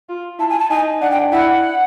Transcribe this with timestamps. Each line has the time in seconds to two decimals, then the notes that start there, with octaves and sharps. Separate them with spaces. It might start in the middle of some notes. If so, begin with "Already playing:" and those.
0.09 F4
0.39 E4 A5
0.49 G#5
0.59 A5
0.70 D#4 G#5
1.01 D4 F#5
1.10 G5
1.32 E4 F#5